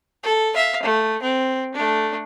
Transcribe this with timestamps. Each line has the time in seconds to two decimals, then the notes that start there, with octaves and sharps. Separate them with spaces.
0.23 A4
0.54 E5 F5
0.83 A3
1.22 C4
1.74 A3 D4